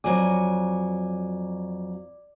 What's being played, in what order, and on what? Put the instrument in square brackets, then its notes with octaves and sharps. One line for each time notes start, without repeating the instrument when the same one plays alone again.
[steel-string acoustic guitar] F2 F#3 G#5 [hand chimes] D5 D6